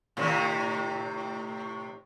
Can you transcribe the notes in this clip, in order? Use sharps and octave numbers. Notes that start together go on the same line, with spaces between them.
A2 C3 D#3